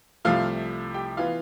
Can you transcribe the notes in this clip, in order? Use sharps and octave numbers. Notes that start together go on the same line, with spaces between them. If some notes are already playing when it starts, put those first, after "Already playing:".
C2 C3 F3 A3 F4 F5
G4 G5
E3 B3 F4 F5